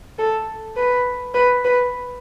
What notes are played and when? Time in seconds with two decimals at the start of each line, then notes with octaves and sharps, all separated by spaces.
0.19 A4
0.76 B4
1.34 B4
1.65 B4